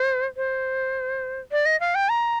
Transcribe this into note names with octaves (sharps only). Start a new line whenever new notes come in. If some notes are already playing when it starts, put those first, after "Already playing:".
Already playing: C5
C5
D5
D#5
F5
G5
A#5